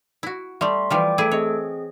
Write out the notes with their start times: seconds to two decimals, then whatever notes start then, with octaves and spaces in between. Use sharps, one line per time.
0.23 E4 F#4
0.61 G3 A3 E5 C6 C#6
0.90 E3 F3 G3 D5 G5 D6
1.18 A3 E4 G#4 A4
1.31 C4 G#4 C#5 D#5